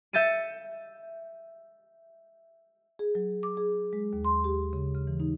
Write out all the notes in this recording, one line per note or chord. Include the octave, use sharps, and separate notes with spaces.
E5 G6 A6 C#7 D#7
G#4
F#3
D6
G#4
G#3
D#2
C6
G4
C#3
C#3
E3
D#4